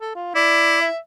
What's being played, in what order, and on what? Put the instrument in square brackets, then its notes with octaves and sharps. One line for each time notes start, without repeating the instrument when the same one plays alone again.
[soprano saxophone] A4
F4
[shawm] E4 [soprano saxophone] D5
[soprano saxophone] E5